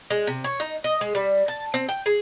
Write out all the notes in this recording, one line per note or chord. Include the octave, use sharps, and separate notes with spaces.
G#3
C3
C#5
D#4
D#5
G#3
G3
A5
C4
G5
G#4